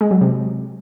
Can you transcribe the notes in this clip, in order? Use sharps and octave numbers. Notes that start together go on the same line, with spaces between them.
G#3
F#3
C3